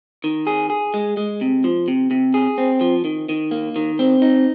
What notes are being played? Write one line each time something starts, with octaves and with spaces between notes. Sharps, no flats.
D#3
G#4
G#4
G#3
G#3
C3
F3
C3
C3
G#4
C4
F3
D#3
D#3
A#3
D#3
C4
D#4